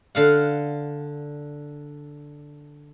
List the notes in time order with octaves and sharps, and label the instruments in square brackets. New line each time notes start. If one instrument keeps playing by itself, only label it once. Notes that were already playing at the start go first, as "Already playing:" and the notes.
[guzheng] D3 F5 F#5